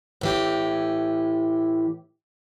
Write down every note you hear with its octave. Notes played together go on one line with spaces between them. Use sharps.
A2 E3 G4